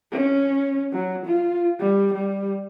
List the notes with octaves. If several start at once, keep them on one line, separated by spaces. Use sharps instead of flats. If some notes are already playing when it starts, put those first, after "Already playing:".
C#4
F#3
F4
G3
G3